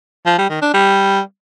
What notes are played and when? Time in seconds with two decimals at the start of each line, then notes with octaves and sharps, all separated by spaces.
0.26 F3
0.38 G3
0.50 D#3
0.62 D4
0.74 G3